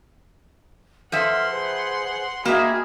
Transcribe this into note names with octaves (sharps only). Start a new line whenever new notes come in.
F3 A4 B4 E5 F#5 C6 F6
G#4 B4 C5
G#3 A#3 F#4 G#4 E5 G5 B5